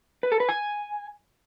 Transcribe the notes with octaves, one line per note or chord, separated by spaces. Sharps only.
B4
A4
B4
G#5